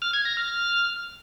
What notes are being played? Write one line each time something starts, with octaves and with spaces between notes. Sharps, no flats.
F6
G#6
A#6
F6